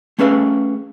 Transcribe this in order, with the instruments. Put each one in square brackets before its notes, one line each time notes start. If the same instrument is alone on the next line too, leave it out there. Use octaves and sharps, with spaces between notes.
[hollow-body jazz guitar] A3 C#4 G#4 B4 E5 F5